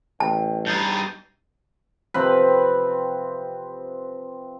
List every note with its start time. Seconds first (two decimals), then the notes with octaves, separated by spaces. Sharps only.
0.20 A1 G5 A5
0.67 G2 D#4 G6 A6 C7
2.14 C3 F3 C4 B4